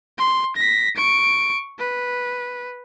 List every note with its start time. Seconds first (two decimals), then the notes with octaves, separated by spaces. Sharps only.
0.18 C6
0.56 A#6 B6
0.96 C#6 D7
1.79 B4